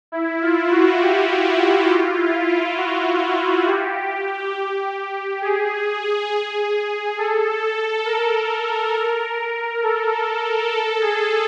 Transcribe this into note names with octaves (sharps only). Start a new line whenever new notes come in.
E4
F4
F#4
G4
F4
E4
F4
F#4
G4
G#4
A4
A#4
A4
A4
A#4
A4
G#4